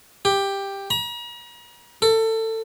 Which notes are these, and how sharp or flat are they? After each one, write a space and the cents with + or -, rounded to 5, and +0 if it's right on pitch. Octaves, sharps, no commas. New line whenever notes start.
G4 +10
A#5 +40
A4 +25